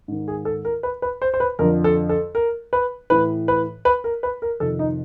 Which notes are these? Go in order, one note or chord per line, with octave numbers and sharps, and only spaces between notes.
G#2 D#3
G#4
A4
A#4
B4
B4
C5
C5
B4
F2 D3 F3 A#4
A4
A4
A#4
B4
A2 E3 B4
B4
B4
A#4
B4
A#4
F2 C3 D#3 A4
D#4